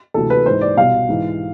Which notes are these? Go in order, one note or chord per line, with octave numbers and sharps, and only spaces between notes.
D2 C3 E3 A4
B4
G#2 E3 C5
D5
C2 B2 F5
G#2 E3